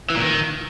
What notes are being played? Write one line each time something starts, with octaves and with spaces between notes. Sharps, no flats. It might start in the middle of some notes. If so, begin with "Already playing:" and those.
E3
A#2
D#3